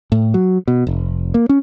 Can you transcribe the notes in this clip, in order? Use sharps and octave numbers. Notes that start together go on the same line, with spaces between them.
A2
F#3
B2
F1
A#3
C#4